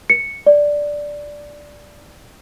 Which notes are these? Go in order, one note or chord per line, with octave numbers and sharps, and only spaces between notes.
C#7
D5